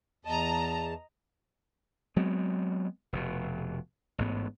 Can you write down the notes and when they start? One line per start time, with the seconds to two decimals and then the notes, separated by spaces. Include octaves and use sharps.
0.25 E2 D#5 A5 A#5
2.16 F#3 G#3 B3 C4
3.13 F1 B2
4.18 A1 G#2 B3